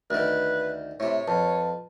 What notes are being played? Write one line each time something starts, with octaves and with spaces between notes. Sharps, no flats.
D2 D#3 B4
A2 C3 C#5
F2 B4 A5